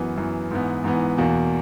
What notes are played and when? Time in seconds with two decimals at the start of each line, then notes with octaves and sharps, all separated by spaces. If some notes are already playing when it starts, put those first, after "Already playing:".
Already playing: F#2 E3 B3
0.17 F#2 E3 B3
0.51 G#2 E3 B3
0.84 G#2 E3 B3
1.17 E2 B2 A#3